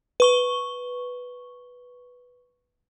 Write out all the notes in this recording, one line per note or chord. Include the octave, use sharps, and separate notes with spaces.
B4 C#6 G7